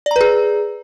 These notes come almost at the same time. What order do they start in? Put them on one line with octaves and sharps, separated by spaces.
D5 A#5 B4 G#4